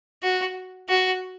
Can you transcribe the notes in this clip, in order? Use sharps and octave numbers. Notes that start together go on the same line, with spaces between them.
F#4
F#4